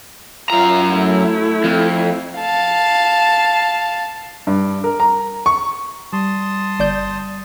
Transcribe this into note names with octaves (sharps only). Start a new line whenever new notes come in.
F#2 F4 A#5
A3 E4
F2
F5 A5
G2
A#4
A#5
C#6
G3 A5 C6 D#6
G1 D5 G6